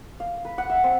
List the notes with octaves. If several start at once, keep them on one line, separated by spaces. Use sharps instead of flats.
F5
B4
F#5
E5
C4